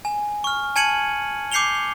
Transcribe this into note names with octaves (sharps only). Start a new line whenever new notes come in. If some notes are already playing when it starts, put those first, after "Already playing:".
G#5
C#6 F6
G#5 A5 G#6 C#7 D#7 F#7
D6 G6 C7 C#7 F7 G7